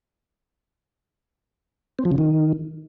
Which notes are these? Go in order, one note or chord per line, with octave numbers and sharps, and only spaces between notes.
C4
F3
C#3
D#3